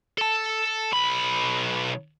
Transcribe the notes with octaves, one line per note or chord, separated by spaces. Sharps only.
A4 A5
B1 B5